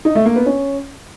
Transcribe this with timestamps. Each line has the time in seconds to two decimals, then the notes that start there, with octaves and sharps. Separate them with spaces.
0.05 D#4
0.15 A3
0.26 A#3
0.36 B3
0.46 C#4